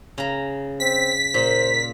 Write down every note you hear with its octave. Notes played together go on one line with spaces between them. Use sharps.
C#3 A#5
C4 B6
A#2 C5